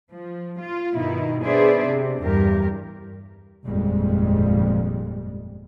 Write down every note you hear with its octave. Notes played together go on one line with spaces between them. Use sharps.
F3
F4
G2 B2 D#3 D#4 E4
B3 D4 G#4 C5 D5 E5
C3
E2 G2 G4 A#4
G1 F2 A#2 G3 G#3